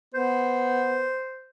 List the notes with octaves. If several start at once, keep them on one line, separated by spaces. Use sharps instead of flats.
B3 C5